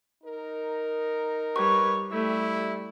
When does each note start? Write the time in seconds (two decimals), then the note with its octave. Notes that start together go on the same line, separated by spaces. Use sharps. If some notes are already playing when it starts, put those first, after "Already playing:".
0.24 D#4 A#4
1.56 G3 B4 C#5 C#6
2.12 G3 A3 E4